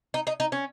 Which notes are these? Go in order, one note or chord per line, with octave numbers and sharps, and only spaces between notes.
D#4
D#4
D#4
C#4